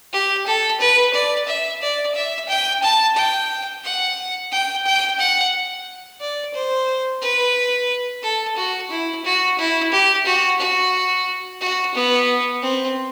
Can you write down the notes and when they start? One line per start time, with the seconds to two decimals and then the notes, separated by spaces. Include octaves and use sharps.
0.13 G4
0.46 A4
0.80 B4
1.14 D5
1.47 E5
1.82 D5
2.15 E5
2.49 G5
2.82 A5
3.16 G5
3.84 F#5
4.51 G5
4.85 G5
5.19 F#5
6.20 D5
6.54 C5
7.22 B4
8.23 A4
8.57 F#4
8.91 E4
9.24 F#4
9.58 E4
9.92 G4
10.26 F#4
10.60 F#4
11.61 F#4
11.94 B3
12.62 C4